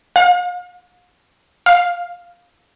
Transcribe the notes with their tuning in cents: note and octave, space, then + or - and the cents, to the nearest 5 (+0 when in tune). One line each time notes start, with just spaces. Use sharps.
F5 +45
F5 +5